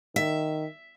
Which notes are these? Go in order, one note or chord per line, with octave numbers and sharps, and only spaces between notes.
D#3 E5